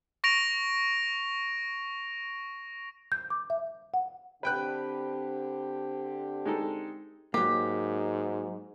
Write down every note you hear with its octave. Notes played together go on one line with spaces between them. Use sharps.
C#6 A#6 D7 F7
G6
D6
E5
F#5
D3 C4 G4 B4 G5 F#6
G#3 D#4 A4
G#2 F#3 A#3 G4